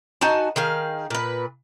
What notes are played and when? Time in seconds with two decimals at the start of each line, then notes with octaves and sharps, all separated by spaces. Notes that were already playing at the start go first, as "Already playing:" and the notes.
0.21 D#4 F#4 G#5 A5
0.56 D#3 G#4 F5
1.10 A#2 B4